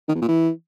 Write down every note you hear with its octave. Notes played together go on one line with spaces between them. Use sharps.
D#3
E2
A#2
E3